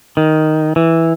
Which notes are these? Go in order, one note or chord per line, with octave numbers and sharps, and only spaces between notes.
D#3
E3